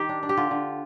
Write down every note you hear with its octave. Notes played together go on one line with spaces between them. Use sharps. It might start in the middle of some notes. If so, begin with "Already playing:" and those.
Already playing: D#3 G4
D4
D4
G4
D3 F4
D3